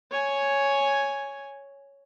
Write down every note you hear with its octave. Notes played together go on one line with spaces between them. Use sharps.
C#5 G#5